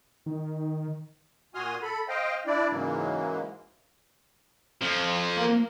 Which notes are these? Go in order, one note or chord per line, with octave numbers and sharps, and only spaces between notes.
D#3
A#2 F#4 G#5 C6 D#6 F6
A4 B5
C5 D#5 F5 G5
D4 E4 D5
G#2 C#3 E3 F#3 G#3 A#3
F2 F3
A#3